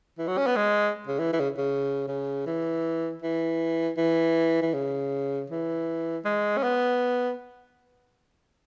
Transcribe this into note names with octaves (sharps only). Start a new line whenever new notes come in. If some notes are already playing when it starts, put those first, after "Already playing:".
E3
F#3
C#4
B3
G#3
C#3
E3
E3
C#3
C#3
C#3
E3
E3
E3
E3
C#3
E3
G#3
C#4
B3